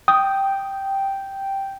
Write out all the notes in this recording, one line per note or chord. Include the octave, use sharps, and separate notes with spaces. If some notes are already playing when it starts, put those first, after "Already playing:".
G5 D#6